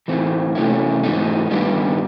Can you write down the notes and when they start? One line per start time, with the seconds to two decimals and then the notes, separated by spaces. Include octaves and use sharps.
0.08 A2 E3 A3 C4
0.55 C3 E3 A3 C#4 E4
1.03 G#2 E3 A3 C4 D#4
1.51 G2 D#3 G3 B3 D4